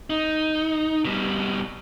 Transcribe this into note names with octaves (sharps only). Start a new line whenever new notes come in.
D#4
B2 G3